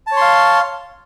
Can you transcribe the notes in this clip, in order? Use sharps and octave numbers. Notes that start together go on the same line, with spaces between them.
C#5 F5 A5 C6